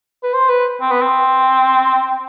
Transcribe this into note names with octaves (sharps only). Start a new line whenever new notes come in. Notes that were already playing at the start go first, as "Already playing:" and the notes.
B4
C5
B4
C4
B3
C4